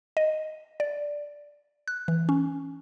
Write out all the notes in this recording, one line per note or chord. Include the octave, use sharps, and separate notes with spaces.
D#5
D5
F#6
E3
C#4